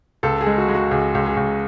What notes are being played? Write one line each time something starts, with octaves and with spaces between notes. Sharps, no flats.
C#2 A4
G#4
G#3
F#4
G#3
F#4
C#2 G#4
C#2
G#4
C#2